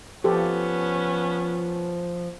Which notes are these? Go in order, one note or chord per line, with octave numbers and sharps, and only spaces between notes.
F3 B3 C#4 G4 A4